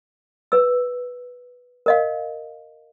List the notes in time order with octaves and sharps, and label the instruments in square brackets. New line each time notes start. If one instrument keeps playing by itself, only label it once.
[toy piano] B4 E6
A#4 D#5 F5